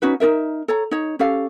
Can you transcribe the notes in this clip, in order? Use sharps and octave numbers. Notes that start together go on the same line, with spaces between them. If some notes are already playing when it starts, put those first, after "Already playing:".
C#4 D#4 F#4 B4
D#4 F4 A#4 E5
A4 C#5 A#5
D#4 C#5
C#4 G4 A4 F5